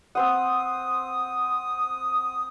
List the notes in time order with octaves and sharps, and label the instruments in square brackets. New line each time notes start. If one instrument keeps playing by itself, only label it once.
[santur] C4 C5 F#5 [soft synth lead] D#6